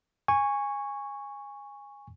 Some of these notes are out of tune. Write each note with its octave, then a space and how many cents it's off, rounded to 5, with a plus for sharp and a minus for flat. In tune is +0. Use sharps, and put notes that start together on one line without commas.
G#5 -15 C#6 +0